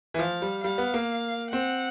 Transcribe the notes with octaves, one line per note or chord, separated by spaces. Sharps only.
E3
F3 F5
G3
G3 F5
B3
A#3
C4 F#5